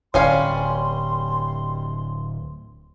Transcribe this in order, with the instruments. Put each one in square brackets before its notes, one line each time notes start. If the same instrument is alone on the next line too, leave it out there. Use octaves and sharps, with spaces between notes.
[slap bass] D1 [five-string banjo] G3 C#4 F5 [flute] C6